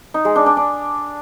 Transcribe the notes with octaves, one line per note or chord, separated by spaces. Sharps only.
D#4
G#3
D4
D4
D4